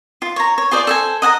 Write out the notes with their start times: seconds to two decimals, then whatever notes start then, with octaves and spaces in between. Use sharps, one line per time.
0.22 F4
0.36 C#5 A#5
0.58 C#5
0.71 F4 G#4 C5 D5
0.87 A4 C5 G#5
1.22 D#5 F#5 G#5 A#5